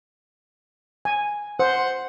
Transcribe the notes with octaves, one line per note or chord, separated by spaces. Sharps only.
G#5
C5 F#5